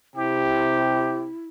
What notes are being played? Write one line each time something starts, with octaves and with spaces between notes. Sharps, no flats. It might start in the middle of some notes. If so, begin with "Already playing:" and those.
C3 E4 G4